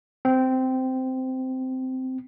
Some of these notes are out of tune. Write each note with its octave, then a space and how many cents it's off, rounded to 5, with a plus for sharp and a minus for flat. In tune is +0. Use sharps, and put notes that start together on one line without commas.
C4 -15